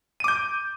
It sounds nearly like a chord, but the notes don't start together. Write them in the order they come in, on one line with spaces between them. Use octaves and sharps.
D#7 D6 G6